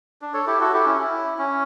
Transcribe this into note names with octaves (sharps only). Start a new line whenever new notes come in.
D4
A4 C#5
E4 G4
F#4 A4
E4 G4
C#4
E4
C#4